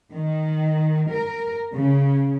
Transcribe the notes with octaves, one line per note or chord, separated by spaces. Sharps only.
D#3
A#4
C#3